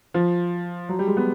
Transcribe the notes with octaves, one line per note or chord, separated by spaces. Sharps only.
F3
F#3
G3
G#3
B3